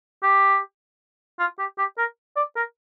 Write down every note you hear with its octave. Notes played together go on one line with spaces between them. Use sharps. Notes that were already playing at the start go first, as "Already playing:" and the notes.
G4
F4
G4
G4
A#4
D5
A#4